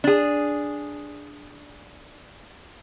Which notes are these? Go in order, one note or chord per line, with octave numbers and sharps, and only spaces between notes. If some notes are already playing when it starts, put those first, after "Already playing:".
D4 G#4